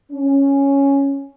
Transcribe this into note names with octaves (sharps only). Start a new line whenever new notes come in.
C#4